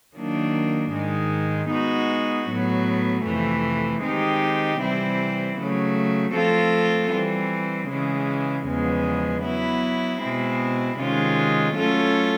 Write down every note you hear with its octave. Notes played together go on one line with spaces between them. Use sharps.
D#3 F#3 A#3 D4
G#2 D#3 G#3
G#3 B3 D#4 F#4
A2 F#3 B3
F2 C3 E3 A3
D#3 G#3 C4 D#4 G4
C3 E3 G3 C4 E4
C#3 F#3 A3
F3 A3 C4 F4 A4
E3 G3 C4
C#3 E3 G#3
E2 C#3 F3 G#3 B3
F#3 B3 E4
B2 G#3 C4 E4
C3 D#3 G#3 C#4 F4
F#3 A3 C#4 F4 A4